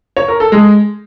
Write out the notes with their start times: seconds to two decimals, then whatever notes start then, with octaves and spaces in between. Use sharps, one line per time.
0.17 C#5
0.28 A#4
0.40 A4
0.52 G#3